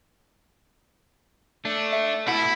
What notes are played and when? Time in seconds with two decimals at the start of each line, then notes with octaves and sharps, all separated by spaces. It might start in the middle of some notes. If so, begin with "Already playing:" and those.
1.65 A3 D4
1.93 E5
2.28 B2 E4 F#5